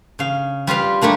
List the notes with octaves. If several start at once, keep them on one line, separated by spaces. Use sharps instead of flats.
C#3 F5
G3 F4 B4 F5
G3 A3 A#3 D4